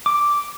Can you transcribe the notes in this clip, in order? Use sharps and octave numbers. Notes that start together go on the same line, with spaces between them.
D6